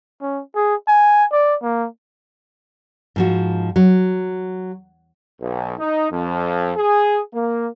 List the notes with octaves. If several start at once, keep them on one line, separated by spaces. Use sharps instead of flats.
C#4
G#4
G#5
D5
A#3
G#2 F3 F#4
F#3
B1
D#4
F2
G#4
A#3